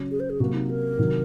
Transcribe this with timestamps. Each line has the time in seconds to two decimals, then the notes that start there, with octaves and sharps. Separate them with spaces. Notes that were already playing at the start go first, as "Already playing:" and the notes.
Already playing: C#3 F#3 C#4 F#4 C#5
0.11 G#4
0.20 C5
0.30 G#4
0.40 C3 F#3 A#3 F#4
0.55 D#4
0.70 A#4
0.99 C3 D#3 F#3